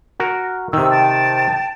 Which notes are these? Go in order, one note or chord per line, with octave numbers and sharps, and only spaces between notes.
F#4 A#4
C3 D#3 E6
G5 A5